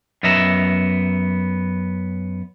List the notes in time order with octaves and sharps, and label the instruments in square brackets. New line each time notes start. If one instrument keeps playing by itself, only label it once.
[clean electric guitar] F#2 B3 D#5 E5 A#5